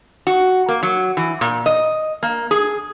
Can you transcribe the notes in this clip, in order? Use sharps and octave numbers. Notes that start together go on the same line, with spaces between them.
F#4
A#3
F#3
E3
A#2
D#5
A#3
G#4